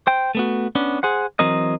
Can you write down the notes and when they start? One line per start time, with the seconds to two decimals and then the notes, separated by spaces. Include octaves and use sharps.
0.07 C5 G5
0.35 A3 B3 F#4
0.75 B3 C#4 D4
1.03 G#4 C5 F#5
1.39 E3 F#3 C4 A#4 D#5